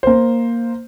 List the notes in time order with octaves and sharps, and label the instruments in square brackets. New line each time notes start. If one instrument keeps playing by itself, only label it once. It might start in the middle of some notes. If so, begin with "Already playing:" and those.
[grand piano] A#3 C5